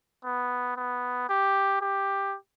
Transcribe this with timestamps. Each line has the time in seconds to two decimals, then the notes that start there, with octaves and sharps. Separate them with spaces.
0.25 B3
0.76 B3
1.29 G4
1.81 G4